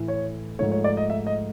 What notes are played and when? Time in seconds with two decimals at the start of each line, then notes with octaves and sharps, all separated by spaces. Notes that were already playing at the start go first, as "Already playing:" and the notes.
Already playing: A2 E3 A3
0.08 C#5
0.59 G#2 F3 A3 C#5
0.72 C#5
0.84 D5
0.97 D#5
1.10 E5
1.27 D#5